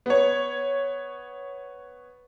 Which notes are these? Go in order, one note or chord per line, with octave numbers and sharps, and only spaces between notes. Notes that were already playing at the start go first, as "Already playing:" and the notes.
B3 C#5